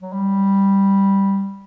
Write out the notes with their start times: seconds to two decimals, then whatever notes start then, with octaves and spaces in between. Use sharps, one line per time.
0.02 F#3
0.13 G3